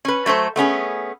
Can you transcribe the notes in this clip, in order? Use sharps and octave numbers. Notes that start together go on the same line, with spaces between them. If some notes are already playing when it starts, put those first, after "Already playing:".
C#4 B4
F#3 A3 A4 C5
A3 B3 C#4 G#4